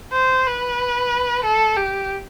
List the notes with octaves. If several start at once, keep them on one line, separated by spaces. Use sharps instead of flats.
C5
B4
A4
G4